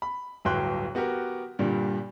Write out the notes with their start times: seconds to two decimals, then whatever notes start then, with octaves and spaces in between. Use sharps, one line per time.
0.02 B5
0.45 D1 G1 F#3 G5 C6 F#6
0.95 B3 F#4 G4 A#4
1.59 G2 A#2 D3 G3